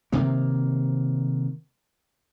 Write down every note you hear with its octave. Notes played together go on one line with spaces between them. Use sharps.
C3 D#3 A#3